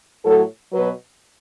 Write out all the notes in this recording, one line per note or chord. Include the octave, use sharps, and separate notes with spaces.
A2 F#3 A4
B2 F#3 B4